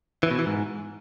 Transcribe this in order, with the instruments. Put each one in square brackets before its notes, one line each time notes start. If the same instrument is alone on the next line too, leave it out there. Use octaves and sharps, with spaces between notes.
[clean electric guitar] E3
B2
E3
G#2